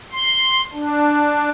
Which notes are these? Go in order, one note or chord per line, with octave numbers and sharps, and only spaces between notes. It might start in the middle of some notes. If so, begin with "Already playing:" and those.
C6
D4